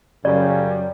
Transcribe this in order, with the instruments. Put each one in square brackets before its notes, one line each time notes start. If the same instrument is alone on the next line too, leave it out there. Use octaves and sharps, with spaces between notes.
[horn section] F#2 G3 [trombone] C#3 [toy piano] D5